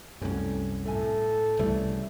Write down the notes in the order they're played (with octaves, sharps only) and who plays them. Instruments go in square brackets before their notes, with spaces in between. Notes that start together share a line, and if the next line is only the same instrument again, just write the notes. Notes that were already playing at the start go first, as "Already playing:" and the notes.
[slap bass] C2 F#2 [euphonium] A3 [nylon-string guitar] C#4
[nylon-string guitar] A2 G#5 [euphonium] A4
[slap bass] C2 E3 [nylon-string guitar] C#3 G3 A3